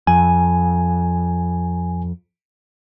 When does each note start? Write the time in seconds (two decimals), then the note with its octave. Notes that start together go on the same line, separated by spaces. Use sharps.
0.07 F2 G#5